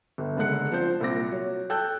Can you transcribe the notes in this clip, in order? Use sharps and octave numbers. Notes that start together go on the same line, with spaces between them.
G1
F#1 D3 G#3 F#6 C#7
F3 C4 D4 C5 G6
C2 A#2 D6 A#6
F#3 C#5
A4 G5 A5 E6 F#6 G6